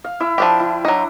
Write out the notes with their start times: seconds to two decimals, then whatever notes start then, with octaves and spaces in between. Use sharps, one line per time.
0.04 F5
0.20 E4 E6
0.38 F3 D4 G4
0.60 E4
0.85 F#3 D4 D#4